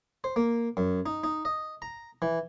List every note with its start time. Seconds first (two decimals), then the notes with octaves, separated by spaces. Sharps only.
0.24 C5
0.36 A#3
0.77 F#2
1.06 D#4
1.24 D#4
1.45 D#5
1.82 A#5
2.22 E3